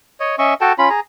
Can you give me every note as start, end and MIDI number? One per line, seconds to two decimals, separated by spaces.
0.20 0.36 73
0.20 0.36 75
0.39 0.54 61
0.39 0.54 75
0.39 0.54 76
0.39 0.54 85
0.61 0.73 66
0.61 0.73 69
0.61 0.73 79
0.61 0.73 81
0.79 0.89 61
0.79 0.89 65
0.79 0.89 83
0.90 1.00 68
0.90 1.00 82